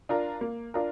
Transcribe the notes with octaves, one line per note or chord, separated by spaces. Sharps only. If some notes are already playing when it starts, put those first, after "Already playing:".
D4 F4 A#4
A#3
D4 F4 A#4